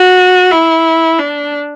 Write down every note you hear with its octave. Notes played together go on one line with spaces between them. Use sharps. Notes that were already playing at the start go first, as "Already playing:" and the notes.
Already playing: F#4
E4
D4